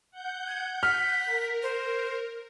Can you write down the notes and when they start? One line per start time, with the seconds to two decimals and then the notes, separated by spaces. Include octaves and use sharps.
0.11 F#5 G6
0.48 G#6
0.83 F6 B6
1.25 A#4
1.63 C5